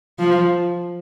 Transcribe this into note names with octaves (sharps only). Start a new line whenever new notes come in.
F3